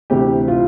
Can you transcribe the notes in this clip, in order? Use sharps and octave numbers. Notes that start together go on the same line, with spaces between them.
D2 C3 E3 G4
F4